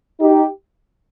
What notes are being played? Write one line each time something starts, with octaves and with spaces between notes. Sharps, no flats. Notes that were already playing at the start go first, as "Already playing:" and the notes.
D#4 G4